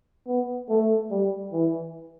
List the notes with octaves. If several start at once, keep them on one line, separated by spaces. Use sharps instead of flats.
B3
A3
G3
E3